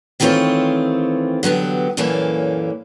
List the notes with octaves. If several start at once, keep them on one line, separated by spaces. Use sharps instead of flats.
D#3 E3 A3 C4 F4 C#5
D3 F#3 B3 G4
F#2 A#2 E3 A#3 C#4 A4